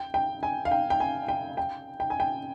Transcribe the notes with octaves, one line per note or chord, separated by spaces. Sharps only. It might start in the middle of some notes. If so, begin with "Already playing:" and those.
Already playing: G5
G5
G#5
F5
G5
G5
G#5
G5
G5
G5
G#5
G5